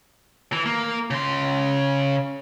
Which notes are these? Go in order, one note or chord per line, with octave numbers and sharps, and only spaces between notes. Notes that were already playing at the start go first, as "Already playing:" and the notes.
E3
A#3
C#3 C6